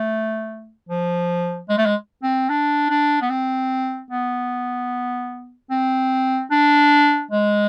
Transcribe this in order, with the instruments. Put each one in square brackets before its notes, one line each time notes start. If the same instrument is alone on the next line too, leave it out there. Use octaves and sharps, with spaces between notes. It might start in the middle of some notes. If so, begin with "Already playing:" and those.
Already playing: [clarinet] A3
F3
G#3
A3
G#3
C4
D4
D4
B3
C4
B3
C4
D4
G#3